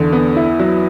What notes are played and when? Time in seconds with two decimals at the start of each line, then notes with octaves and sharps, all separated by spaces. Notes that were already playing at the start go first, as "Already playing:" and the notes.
Already playing: E2 D3
0.13 B3
0.36 E4
0.59 F#3